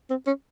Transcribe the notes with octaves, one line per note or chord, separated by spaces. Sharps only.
C4
C#4